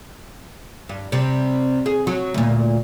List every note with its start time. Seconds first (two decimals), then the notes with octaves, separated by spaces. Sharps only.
0.89 G2
1.12 C3 G3 C4
1.86 G#4
2.07 F#3
2.34 D2 A#2